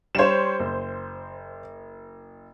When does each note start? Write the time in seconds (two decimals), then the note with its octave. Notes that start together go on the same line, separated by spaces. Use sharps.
0.15 G3 C5 C#5 E7
0.59 F#1